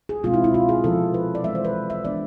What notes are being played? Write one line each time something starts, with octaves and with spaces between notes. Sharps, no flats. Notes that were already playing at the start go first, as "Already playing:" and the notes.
G#4
B2 G#3 C4 F4
E4
E4
F4
G#4
C3 F3 B3 A4
B4
D5
E3 G#3 B3 E5
C5
B4
E5
E3 G#3 B3 D4 D5